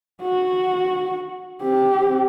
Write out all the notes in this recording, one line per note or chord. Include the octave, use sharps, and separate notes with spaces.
F#4
C4 G4